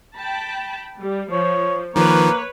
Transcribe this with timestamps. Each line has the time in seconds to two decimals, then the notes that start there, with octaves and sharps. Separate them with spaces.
0.17 G5 A5 B5
1.01 G3
1.32 F3 C#5
1.96 D#3 F3 A#3 B4 C#5